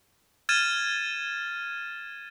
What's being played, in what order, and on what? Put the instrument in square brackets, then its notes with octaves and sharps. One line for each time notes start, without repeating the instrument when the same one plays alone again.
[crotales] F6 G#6 A6 D#7 E7